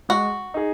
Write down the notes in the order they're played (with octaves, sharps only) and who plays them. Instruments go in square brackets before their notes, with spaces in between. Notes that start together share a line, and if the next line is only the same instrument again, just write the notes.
[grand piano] G#3 [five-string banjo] F#4
[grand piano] D#4 G#4